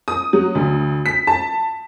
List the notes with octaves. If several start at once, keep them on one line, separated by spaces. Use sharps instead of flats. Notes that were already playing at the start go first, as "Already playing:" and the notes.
D#6
F#3
D2
B6
A5